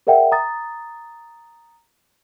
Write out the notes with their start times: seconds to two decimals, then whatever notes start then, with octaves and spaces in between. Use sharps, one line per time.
0.07 G#4 A#4 D5 E5 F#5 G5
0.32 A#5 D#6 A6